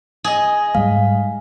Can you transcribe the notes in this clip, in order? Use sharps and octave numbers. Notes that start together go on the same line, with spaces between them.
G#4 D#5
G#2 G3 G#3 F5